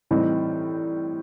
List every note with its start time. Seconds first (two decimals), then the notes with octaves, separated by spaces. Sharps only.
0.11 A2 E3 G3 C4 D#4